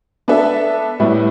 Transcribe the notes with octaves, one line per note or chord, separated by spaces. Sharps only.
B3 D4 A4 E5
A2 G3 B3 E4